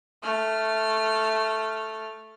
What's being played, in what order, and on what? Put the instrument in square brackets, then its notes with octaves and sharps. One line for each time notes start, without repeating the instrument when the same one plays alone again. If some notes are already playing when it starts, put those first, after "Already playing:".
[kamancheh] A3 F6